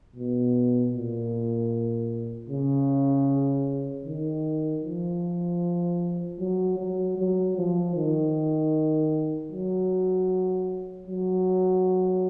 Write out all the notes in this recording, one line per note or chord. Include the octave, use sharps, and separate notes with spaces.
B2
A#2
C#3
D#3
F3
F#3
F#3
F#3
F3
D#3
F#3
F#3